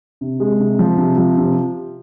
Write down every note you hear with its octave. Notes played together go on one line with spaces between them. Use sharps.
C3
G#3
C3
F3
C3
F3
C3